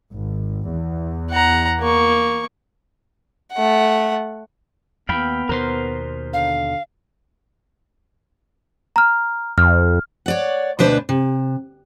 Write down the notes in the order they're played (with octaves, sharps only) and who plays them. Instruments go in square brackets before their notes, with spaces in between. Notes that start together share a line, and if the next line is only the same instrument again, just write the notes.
[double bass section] G#1
E2
[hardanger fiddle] F#5 A#5
A#3 C#6
A3 F#5
[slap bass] D#2 [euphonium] B3 [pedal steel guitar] F5 G5 B5
[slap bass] D#2 B2 [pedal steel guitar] A#4 C5 C6
[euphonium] D3 [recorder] F5
[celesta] A#5 F6
[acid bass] F2 [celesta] F6
[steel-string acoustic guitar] C#5 D5 F#5
D2 B2 D4 B4 C5
C3